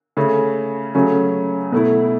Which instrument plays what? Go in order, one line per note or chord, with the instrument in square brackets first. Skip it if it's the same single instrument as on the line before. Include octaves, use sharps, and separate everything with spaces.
[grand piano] C#3 A3 C#4
C#3 F#3 A3 C#4
B2 A3 E4